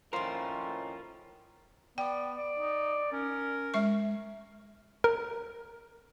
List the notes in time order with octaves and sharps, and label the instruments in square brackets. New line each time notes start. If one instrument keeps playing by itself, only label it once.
[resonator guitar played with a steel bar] F2 C5 [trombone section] A2 D#3 C#4 [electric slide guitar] F4 A#4
[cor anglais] B3 [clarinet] D5 [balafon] G5
[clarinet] D5
[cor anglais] D#4
[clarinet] C#4 [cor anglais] A#4
[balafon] G#3 E5 C#6
[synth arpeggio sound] A#4